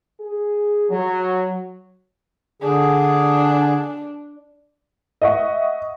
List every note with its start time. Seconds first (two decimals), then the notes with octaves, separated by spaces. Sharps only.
0.19 G#4
0.90 F#3
2.62 D3 D4 G#4
5.22 D#5 E5 F#5 C#6